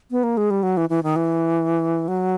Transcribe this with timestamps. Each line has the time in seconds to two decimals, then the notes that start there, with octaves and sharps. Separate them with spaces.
0.11 B3
0.23 A#3
0.37 G#3
0.50 G3
0.63 F#3
0.77 E3
0.89 E3
1.03 D#3
1.16 E3
2.08 F#3